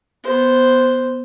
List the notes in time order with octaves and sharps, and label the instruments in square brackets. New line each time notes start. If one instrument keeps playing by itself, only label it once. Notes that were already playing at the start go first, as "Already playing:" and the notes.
[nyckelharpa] B3 C5